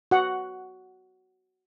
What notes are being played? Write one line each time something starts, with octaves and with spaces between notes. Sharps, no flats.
F#4 F#5